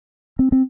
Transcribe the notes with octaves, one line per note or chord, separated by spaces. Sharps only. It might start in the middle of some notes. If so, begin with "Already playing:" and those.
C4
C4